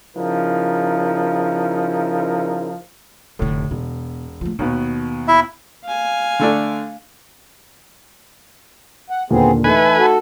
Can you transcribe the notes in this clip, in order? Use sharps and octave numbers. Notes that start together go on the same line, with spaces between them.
C#3 F3 D#4 E4 A#4
F1 A2 D3
E1 B2
F3 A3
D#2 B2 D#3 B3
E4 E5
F5 G#5
D3 A3 D4
F#5
D#2 A#2 D3 B3 C4 G#4
E3 A3 D#4 A4 B4 G#5
F#4 A4